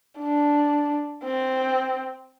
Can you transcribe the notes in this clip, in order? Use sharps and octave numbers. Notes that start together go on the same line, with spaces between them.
D4
C4